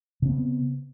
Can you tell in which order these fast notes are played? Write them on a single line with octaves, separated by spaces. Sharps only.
C#3 C4 B3